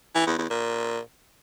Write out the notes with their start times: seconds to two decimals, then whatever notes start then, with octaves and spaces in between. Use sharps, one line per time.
0.15 E3
0.27 E2
0.38 E2
0.50 A#2